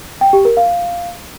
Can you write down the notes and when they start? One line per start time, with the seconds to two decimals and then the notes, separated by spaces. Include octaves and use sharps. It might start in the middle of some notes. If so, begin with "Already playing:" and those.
0.21 G5
0.33 G4
0.45 A#4
0.57 F5